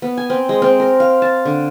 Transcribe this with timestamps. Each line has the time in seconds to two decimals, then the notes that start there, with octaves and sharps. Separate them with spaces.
0.02 B3
0.17 G#5
0.30 C4
0.49 G#3
0.62 C4
0.80 A#4
1.00 F5
1.22 A5
1.45 D3